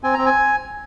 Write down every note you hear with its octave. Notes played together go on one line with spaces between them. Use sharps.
C4 G#5
C4 A#5
G#5